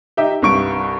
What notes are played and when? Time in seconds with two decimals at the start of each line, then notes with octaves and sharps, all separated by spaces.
0.17 D#4 G4 E5
0.42 C2 G2 C#6 D7